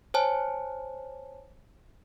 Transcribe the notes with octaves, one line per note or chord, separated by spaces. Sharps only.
C5 C#5 G#5 A5